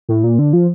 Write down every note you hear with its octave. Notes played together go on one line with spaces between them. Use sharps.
A2
A#2
D3
F3